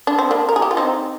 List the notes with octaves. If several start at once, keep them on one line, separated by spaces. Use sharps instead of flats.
D4
C4
A#3 D4
A#4
G#4
G4
F4
C4 D#4